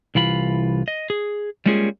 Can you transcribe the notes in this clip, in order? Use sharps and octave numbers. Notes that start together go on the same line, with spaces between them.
C2 E3 F4 B5
D#5
G#4
G3 G#3 A#3 C#4 F4 G#4